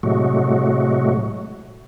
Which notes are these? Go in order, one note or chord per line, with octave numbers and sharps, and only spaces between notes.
A2 C3 F#3 G#3 A3 F#4